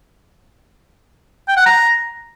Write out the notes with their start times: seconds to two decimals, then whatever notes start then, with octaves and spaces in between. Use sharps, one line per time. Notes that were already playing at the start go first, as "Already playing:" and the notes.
1.48 G5
1.57 F#5
1.66 A#5